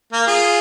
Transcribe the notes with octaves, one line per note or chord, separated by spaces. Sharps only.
A#3
F4 G#4